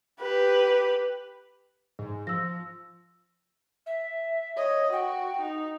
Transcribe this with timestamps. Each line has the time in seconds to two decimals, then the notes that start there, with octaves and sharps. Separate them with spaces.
0.21 G4 B4
1.99 G#2
2.27 F3 E6 A#6
3.86 E5
4.57 C#5 D#5
4.93 F#4 G5
5.42 D#4